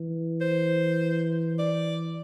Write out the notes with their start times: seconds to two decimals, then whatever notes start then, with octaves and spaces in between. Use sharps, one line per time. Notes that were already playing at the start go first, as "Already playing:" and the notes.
Already playing: E3
0.41 C5
1.59 D5